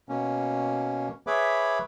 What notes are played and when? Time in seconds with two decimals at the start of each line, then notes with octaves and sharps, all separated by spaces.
0.09 B2 A#3 C#4
1.27 G#4 B4 C#5 E5 B5 D6